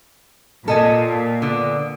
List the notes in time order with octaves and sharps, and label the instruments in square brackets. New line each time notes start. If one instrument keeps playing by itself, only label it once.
[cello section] A#2 [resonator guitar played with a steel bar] A4 D#5 G#5
[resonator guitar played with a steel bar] D3 B3